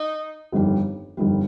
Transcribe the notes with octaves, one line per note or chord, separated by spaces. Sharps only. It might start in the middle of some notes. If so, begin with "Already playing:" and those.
Already playing: D#4
G1 F2 D#3 G3
G1 F2 D#3 G3